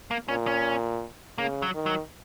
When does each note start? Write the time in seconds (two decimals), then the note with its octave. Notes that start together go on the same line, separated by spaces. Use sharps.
0.11 A#3
0.28 A#2 C#4
0.47 C#4
1.38 C#3 A#3
1.62 F#3
1.74 D#3
1.86 F#3